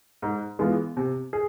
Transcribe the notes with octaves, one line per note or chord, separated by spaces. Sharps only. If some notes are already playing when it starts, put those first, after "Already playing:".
G#2
E3 G#3 B3 F4
C3
G#4